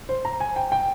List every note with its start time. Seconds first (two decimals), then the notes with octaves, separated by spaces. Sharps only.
0.09 C5
0.25 A#5
0.41 G#5
0.56 G5
0.72 G5